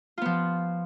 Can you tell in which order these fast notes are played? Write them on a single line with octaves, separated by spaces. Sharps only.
F4 B3 F3